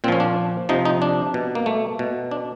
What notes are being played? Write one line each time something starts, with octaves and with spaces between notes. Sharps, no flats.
A#2 F3 C4 C#4
D4
C3 F3 D#4
D#4
D4
B2
A#3
A3
B2
D4